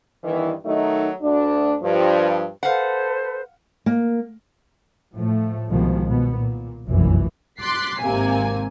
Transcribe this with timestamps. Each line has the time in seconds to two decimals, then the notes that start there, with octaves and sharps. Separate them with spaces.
0.24 E2 G2 D#3 E3
0.65 D#3 F#3 A3 D#4
1.22 D2 D4
1.82 G2 F3
2.63 A4 B4 C5 F5 F#5
3.86 A#3
5.15 A2 F3 A3
5.70 C2 B2 D#3 F3 G#3
6.08 B2 B3
6.39 A#2
6.88 F1 B1 F#2 A#2 E3
7.59 C6 D6 F#6 A6 B6 C7
7.99 G#1 C3 A#3 G#5